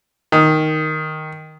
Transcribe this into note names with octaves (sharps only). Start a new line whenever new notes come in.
D#3